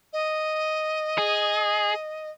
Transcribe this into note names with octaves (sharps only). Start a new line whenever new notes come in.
D#5
G#4